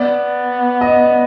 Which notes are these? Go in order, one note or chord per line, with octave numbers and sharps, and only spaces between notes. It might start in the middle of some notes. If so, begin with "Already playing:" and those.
Already playing: B3 D5
D#5